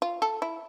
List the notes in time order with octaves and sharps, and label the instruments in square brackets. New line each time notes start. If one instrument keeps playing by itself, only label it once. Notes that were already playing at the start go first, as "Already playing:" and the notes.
[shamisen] F4
A4
E4